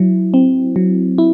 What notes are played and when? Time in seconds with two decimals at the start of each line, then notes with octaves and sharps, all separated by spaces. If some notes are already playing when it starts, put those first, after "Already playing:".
Already playing: F#3 E4
0.34 C4
0.76 F#3
1.18 E4